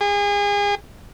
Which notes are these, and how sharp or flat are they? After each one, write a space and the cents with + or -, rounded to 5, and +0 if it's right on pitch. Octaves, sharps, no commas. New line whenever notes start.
G#4 -35